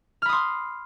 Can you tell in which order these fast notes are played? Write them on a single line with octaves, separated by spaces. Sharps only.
F6 B5 D#6 C6